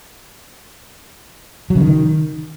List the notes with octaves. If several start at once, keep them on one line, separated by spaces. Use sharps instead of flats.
F#3
C#3
D#3